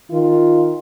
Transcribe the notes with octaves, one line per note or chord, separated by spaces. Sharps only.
D#3 F4